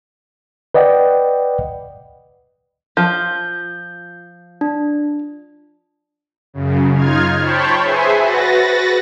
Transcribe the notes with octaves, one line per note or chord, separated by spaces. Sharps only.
B4 D5 D#5 F#5 G5
F3 G6
D4
F#2 C#3
D#4 F4 F6 G#6
C5 C#5 G5 A5 B5 C#6
G#4 B4 C5 E5 G#5
F#4 B4 A6 A#6